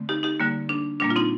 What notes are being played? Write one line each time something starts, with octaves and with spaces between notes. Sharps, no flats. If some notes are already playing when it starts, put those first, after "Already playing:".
Already playing: D3 A3 C4
D#4 G4
D#4 G4
D3 G3 A#3
D4
A#2 G3 A#3 D4
F4
C4 D#4